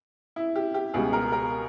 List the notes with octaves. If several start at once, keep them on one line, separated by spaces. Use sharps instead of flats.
E4
G4
G4
C#2 B2 G3 G#4
A#4
A#4